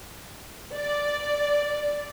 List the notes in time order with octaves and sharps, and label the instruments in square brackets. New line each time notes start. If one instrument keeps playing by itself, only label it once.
[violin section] D5